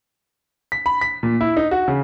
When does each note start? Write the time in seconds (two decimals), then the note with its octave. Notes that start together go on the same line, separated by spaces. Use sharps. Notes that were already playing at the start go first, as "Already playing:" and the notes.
0.72 B6
0.86 B5
1.01 B6
1.23 A#2
1.41 E4
1.57 D#4
1.71 F#4
1.88 C#3